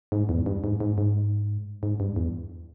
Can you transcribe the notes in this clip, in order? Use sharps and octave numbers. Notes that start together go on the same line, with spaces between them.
G#2
E2
G2
G#2
G#2
G#2
G#2
G2
E2